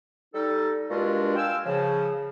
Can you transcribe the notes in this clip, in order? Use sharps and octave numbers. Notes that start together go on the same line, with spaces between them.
G3 D#4 A4
G2 A#2 G#3 D4 F4 F#4
F5 G5 G#5 E6
C#3 F3